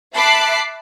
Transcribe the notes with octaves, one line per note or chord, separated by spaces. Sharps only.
E5 A5 B5 D6 F#6 C7